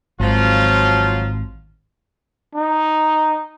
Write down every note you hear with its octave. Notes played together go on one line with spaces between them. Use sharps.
G#1 F3 F#3 F4
D#4